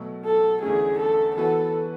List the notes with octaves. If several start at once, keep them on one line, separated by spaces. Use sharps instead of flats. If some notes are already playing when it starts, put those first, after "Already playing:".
Already playing: B2 F#3 A3
A4
E2 D3 A3 C#4 G#4
A4
E3 B3 F#4 A4 B4